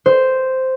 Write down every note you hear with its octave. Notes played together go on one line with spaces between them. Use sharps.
C5